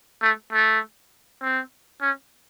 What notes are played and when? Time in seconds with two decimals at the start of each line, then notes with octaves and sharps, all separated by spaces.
0.22 A3
0.52 A3
1.42 C4
2.01 C#4